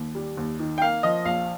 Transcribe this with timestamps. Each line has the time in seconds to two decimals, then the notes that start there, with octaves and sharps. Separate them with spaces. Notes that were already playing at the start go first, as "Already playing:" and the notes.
Already playing: D#2
0.15 G3
0.37 D#2
0.59 D#3
0.78 G5
0.82 A#3 F5
1.03 F3 D#5
1.25 A#1 F5